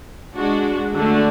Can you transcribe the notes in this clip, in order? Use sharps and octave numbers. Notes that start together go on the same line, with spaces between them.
G#3 D4 F#4
D3 A3 D4 F#4